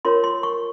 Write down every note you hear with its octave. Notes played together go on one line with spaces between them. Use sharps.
F4 A#4 C#5 C6
C6
C#6